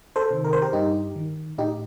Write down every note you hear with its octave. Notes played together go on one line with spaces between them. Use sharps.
A4 C5
C3 D#3
A#4
C5
G4 A#4
G2 D#4 G4
D#3
A2 D#4 G4